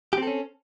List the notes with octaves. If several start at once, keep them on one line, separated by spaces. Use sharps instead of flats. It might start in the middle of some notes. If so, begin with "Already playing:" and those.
C4 C#4 G4 A4